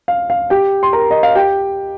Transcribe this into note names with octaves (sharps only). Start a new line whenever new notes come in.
F5
F5
G4 G5
C6
A#4 A#5
D#5
F5
G4 G5